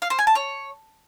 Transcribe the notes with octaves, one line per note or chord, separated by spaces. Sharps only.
F5
C5
G#5
A5
C#5